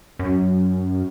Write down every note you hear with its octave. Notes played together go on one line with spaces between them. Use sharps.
F#2